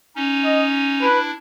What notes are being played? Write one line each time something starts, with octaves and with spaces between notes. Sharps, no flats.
C#4 D#4
D#5
D4 E4 B4